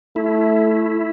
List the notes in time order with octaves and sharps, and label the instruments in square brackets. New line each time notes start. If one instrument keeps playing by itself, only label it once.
[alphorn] A3 [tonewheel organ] E4